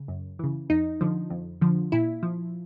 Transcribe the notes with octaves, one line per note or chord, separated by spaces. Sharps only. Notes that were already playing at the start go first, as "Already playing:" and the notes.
Already playing: C#3
F#2
C#3 E3
F2 D#4
D3 F3
F2
D3 F3
A#2 E4
F3